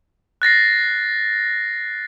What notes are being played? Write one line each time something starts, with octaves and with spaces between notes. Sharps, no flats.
F#6 A6 A#6 C7